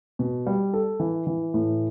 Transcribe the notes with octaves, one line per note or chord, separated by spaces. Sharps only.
B2
G3
A4
E3
E3
A2